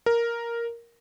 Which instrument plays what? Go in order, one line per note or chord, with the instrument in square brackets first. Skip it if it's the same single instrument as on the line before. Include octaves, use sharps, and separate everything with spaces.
[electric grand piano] A#4